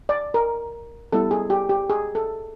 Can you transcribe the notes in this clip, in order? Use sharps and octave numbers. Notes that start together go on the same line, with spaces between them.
D5
A#4
G3 B3 E4 A4
G#4
G4
G4
G#4
A4